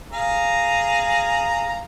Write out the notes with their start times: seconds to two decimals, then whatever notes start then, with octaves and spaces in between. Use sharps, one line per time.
0.13 G#4 F5 A#5